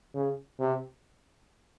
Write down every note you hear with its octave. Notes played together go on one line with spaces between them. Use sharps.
C#3
C3